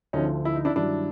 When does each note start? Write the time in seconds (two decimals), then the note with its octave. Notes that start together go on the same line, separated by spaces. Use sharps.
0.13 D2 D3 F3 C#4 D#4
0.45 E4
0.56 D#4
0.65 D4 E4
0.76 G2 D#3 F#3 D4 E4